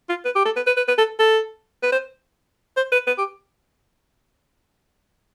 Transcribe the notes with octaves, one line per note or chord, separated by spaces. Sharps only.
F4
B4
G4
A4
B4
B4
B4
B4
A4
A4
B4
C5
C5
B4
B4
G4